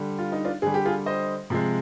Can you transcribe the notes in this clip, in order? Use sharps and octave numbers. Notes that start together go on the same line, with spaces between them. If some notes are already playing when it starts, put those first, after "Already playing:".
Already playing: D3 G3
F4
D#4
D4 F4
D3 G3 G#4
G4
F4 G#4
C5 D#5
C3 F3 G#3